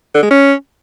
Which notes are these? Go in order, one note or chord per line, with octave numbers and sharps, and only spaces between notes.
D3
G#3
C#4